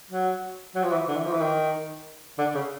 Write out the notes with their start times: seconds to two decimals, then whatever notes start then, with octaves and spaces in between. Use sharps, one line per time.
0.10 F#3
0.75 F#3
0.84 F3
0.92 E3
1.08 D3
1.16 E3
1.25 F3
1.32 E3
1.41 D#3
2.39 D3
2.55 C#3